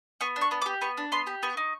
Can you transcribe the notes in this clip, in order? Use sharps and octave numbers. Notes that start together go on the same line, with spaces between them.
B3 C#6
D4
C#6
B3
D6
G4
B3 C#6
D4
B3 C6
G4
B3 C#6
D#4